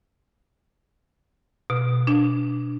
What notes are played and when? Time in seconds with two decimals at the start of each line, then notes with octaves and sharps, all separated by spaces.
1.70 B2
2.07 D4